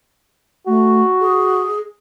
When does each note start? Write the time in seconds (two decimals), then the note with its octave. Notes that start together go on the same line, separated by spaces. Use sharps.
0.67 A3 F#4
1.21 G#4